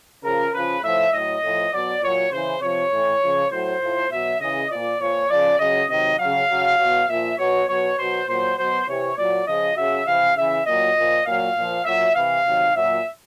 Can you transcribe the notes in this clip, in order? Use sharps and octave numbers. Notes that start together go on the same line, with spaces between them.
C#3 F3 A#4
C#3 F3 B4
A2 F3 E5
A2 F#3 D#5
A2 F3
B2 F#3 D5
A#2 F#3 C#5
C#3 E3 C5
C3 F3 C#5
A2 E3
C#3 F3
A2 F#3 C5
A2 F3
B2 F#3 E5
C#3 E3 D#5
A#2 F3 D5
A#2 F3 C#5
C#3 F3 D5
C#3 F#3 D#5
C3 D#3 F#3 D#5
C#3 F#3 F5
C#3 F#3
B2 F#3
A#2 F3 E5
B2 F#3 C#5
B2 F#3 C#5
B2 F#3 C5
A#2 F#3 C5
B2 F#3 C5
C3 E3 C#5
A#2 F#3 D5
C#3 F3 D#5
C#3 F#3 E5
C3 E3 F5
C#3 E3 E5
A#2 F#3 D#5
A#2 F3
A#2 F#3 F5
A#2 F3
A#2 F#3 E5
C3 E3 F5
C3 D#3 F#3
A#2 F#3 E5